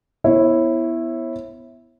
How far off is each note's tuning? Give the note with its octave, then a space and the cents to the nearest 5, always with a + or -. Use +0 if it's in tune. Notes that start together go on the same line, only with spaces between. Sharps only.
B3 +0 E4 +0 C#5 -40